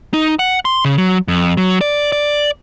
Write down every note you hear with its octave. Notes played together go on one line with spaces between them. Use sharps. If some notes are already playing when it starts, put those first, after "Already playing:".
D#4
F#5
C6
C#3
F#3
F2
F#3
D5
D5